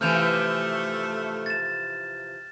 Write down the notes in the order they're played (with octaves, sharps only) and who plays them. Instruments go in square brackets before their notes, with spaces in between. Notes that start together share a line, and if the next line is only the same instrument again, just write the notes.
[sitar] C3 E3 F3 [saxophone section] A3 [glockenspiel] F6 G6 F7
[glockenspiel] A6 E7